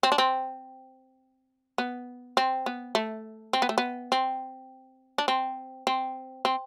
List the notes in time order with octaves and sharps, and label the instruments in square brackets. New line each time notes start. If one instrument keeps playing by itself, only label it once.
[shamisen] C4
D4
C4
B3
C4
B3
A3
C4
B3
A3
B3
C4
D4
C4
C4
C4